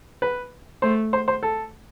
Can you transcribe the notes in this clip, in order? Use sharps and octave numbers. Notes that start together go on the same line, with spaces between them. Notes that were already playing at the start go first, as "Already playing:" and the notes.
B4
A3 C5
C5
C5
A4